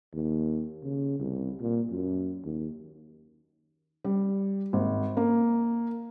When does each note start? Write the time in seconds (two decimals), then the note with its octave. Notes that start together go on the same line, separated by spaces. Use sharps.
0.13 D#2
0.83 C#3
1.19 C2
1.61 A#2
1.90 F#2
2.44 D#2
4.05 G3
4.73 G#1
5.17 A#3